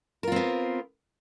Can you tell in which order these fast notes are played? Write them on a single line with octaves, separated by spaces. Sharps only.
A#4 F4 C4 B3